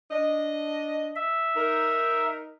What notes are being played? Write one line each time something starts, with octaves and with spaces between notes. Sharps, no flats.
D4 D#5
E5
D#4 A#4